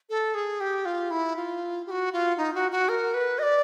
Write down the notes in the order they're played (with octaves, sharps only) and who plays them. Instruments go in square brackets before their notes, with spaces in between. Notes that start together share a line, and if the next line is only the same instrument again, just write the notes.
[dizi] A4
G#4
G4
F4
E4
F4
G4
F#4
F4
D#4
F#4
F#4
A#4
B4
D#5
D5